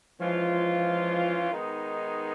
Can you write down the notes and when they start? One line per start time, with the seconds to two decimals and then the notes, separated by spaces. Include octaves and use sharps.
0.20 E3 F3 G#3 C#4 F4
1.51 D#3 G#3 B3 D#4